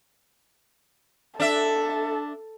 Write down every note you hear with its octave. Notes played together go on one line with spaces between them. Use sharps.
D4 A4 E5